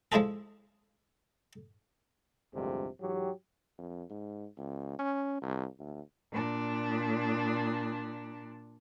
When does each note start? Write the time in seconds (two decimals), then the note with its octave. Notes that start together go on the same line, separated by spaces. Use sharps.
0.12 F3 G#3 E4 F4 G#4 A4
2.54 A1 D2 G2 C3 F3 G#3
3.01 G#2 E3 F#3 G4
3.78 F2
4.10 G#2
4.58 C#2
4.99 C#4
5.42 C2
5.80 D2
6.32 A#2 D4